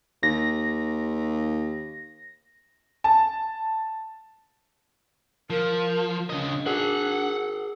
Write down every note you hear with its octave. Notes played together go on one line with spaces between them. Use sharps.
D#2 A#6
A5
F3 A#4
C#3 D4 D#5
G#4 A#4 F#5